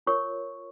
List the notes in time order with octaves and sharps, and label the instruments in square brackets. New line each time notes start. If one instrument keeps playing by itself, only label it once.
[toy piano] F4 A#4 C#5 C#6